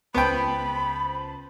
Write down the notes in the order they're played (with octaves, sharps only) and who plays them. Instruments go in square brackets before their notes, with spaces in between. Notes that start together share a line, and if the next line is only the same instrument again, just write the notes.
[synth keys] C#2 C5 A5 [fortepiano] B3 G5 [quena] B5